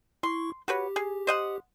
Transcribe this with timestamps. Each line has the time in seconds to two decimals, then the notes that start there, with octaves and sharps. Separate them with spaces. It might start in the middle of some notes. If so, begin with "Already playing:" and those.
0.23 E4 C6 C#6
0.68 F#4 G4 B4 C#5
0.96 G#4
1.27 C5 D#5 F#5